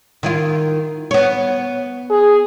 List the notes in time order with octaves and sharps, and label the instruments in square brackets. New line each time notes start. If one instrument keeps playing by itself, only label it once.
[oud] D#3 E4 F4
B3 C#5
[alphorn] G#4